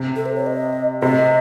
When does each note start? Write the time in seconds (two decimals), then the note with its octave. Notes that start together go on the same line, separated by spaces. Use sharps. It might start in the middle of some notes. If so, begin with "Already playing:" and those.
Already playing: C3
0.16 A4
0.26 C5
0.36 C#5
0.46 D#5
1.02 C3 D#5